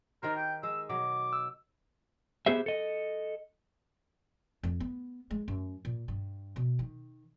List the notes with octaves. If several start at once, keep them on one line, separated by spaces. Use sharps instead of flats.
D#3 G4 A#4 C5
G5
G#3 E6
B2 F#3 D6
E6
B3 G4 G#4 C5 E5
A4 D#5
F2
B3
G#3
F#2
A#2
G2
B2
D#3